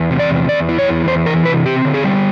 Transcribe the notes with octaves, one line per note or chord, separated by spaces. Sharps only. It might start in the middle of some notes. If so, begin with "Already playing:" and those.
Already playing: E2
C3
D5
E2
E2 D5
E3
C#5
E2
E2 C5
E3 A#4
C3 B4
C4 G4
D3
G#4
G3